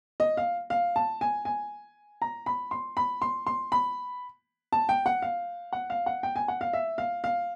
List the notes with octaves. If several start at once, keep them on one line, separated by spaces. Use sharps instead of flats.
D#5
F5
F5
A5
G#5
G#5
A#5
B5
C6
B5
C6
C6
B5
A5
G5
F#5
F5
F#5
F5
F#5
G5
G#5
F#5
F5
E5
F5
F5